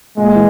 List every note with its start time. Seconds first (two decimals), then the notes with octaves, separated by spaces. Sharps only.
0.17 A#2 G#3
0.35 E3